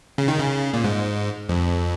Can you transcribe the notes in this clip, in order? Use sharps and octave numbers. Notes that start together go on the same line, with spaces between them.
C#3
D#3
C#3
A#2
G#2
F2